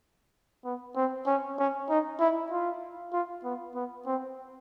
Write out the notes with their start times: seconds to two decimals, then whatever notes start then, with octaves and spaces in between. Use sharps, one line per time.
0.65 B3
0.96 C4
1.27 C#4
1.58 C#4
1.89 D#4
2.20 E4
2.51 F4
3.13 F4
3.44 B3
3.75 B3
4.06 C4